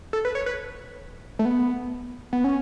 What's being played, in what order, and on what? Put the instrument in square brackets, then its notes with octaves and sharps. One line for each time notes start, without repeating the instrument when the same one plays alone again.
[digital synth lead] A4
B4
C#5
B4
A3
B3
B3
C#4